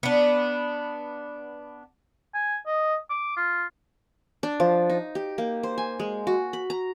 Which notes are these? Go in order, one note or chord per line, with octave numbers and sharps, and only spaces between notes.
B3 D4
G#5
D#5
D6
F4
D4
F3
D#4
G4
A#3
C5
G#5
G#3
F#4
B5
A#5